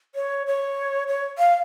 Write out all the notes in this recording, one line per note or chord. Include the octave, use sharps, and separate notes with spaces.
C#5
C#5
C#5
F5